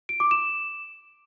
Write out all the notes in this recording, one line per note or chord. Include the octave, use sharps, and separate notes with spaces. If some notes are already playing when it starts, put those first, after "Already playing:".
D7
D6
E7